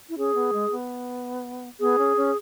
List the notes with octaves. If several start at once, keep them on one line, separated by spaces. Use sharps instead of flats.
E4
C#4 G#4
B3
G#3
B3
B3 G#4
C#4
C#4